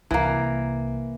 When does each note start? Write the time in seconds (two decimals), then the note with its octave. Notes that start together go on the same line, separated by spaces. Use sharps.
0.11 C2 E3 A#3